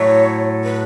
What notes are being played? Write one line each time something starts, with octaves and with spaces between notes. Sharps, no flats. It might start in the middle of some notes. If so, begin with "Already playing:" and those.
Already playing: A2 F#3 A3 C#5
B4